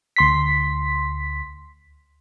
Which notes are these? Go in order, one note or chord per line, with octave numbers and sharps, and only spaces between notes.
D2 C6 B6